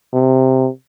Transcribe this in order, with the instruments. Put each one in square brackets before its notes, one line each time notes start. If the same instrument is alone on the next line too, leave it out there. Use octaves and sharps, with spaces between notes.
[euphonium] C3